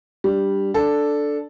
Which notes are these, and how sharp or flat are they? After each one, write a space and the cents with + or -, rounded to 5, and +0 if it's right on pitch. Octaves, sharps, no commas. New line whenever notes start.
G3 +0 D4 +0
D4 +0 A4 +0